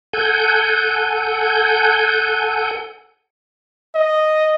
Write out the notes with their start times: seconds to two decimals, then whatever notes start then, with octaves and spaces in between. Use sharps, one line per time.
0.13 A4 F#5 G#5 G6
3.95 D#5